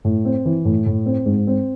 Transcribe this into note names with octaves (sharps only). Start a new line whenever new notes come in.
A2
C4
E3
A2
A2
C4
G#2
C4